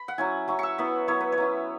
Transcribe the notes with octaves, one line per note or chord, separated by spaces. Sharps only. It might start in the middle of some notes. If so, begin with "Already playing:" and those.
Already playing: B5
F#5
F#3 C#4 E4 G#5
F#3 C#4 E4 C#6
C#6 E6
F#3 B3 E4 B5
F#3 B3 E4 C#5
B4
C#5
F#3 C#4 E4